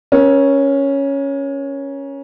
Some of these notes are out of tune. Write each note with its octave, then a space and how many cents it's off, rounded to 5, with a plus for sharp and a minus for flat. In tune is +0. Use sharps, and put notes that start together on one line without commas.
C#4 +0 A#4 +35